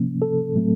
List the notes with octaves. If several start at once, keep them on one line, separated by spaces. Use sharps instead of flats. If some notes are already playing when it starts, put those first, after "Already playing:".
Already playing: C3 F3 A#3 C#4
A4
A2 F#3 A3 C4